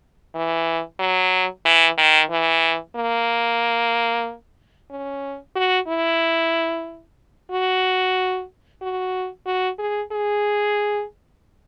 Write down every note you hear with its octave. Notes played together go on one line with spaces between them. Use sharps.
E3
F#3
E3
D#3
E3
A#3
C#4
F#4
E4
F#4
F#4
F#4
G#4
G#4